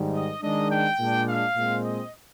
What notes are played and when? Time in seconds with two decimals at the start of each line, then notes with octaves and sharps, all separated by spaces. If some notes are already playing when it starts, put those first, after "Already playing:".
Already playing: G#2 D#3 G3
0.13 D#5
0.42 D#3 G#3 D4 D#5
0.70 G5
0.99 A#2 G#3 D4
1.27 F5
1.56 A#2 G#3 C4
1.85 D#5